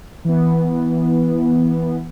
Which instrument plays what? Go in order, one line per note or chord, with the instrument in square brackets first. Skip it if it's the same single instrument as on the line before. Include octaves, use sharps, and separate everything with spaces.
[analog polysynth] E3 B3